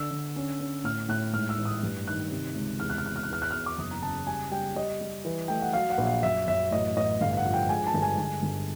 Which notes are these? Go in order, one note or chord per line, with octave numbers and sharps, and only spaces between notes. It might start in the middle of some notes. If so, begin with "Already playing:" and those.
Already playing: D3 E6
D3
C#4
C#4
A2 F6
A2 F#6
G#2 F6
E6
A1
D#6
G2
D#3 F#6
C3
C#2
E2 F6
F#6
F6
E2 F#6
F6
F#6
E2 F6
F#6
E2 F6
D6
F#1 D#6
A#5
C#3 A5
G3 G#5
G3 G5
G3 D#5
G3
E3
A3 G5
F#5
F#3 F5
F#5
A#1
F5
F#2 E5
F#2 E5
A1 D#5
A1 D#5
G1 F5
F5
F#5
F3
G5
G#3 G#5
A5
G1
G#5
G1 G#5
G1